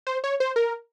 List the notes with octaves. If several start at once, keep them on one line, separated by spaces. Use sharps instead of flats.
C5
C#5
C5
A#4